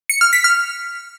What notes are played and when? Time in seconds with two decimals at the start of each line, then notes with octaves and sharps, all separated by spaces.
0.09 C#7
0.21 F6
0.33 B6
0.44 F6